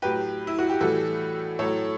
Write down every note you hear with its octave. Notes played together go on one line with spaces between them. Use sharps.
A2 F#3 G4 B4
E4
F#4
G4
A2 E3 G3 F#4 A4
A2 F#3 A4 C#5